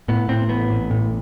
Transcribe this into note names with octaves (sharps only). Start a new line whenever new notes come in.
A2 B3
A2 C4
A1 B3
A1
A2